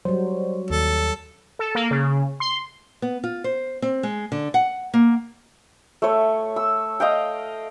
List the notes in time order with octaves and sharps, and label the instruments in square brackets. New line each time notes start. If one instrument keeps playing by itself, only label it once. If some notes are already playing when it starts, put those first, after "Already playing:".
[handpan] F#3 G3 [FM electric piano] C5
[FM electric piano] D#2 [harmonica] A4
[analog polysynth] A4
A#3
C#3
C6
[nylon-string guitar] B3
F4
C5
C4
G#3
D3
F#5
A#3
[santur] A3 C#5
E6
D#5 F5 G5